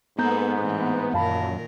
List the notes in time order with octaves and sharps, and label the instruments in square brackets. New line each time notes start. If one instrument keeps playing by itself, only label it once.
[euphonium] G#2 [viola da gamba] A#3 G#4 A4 [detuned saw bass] B3 [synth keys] A#5 G6
[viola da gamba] A2 E3 C4
[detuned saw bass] F#2 [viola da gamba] A#2 D#3 A#4 [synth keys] F5 A5 B5